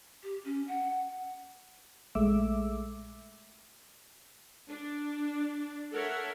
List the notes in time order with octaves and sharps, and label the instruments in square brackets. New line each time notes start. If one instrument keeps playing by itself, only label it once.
[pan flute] G4
C#4
F#5
[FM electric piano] A#1 G#3 A3 E5 D6 E6
[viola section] D4
A4 A#4 C#5 E5 F#5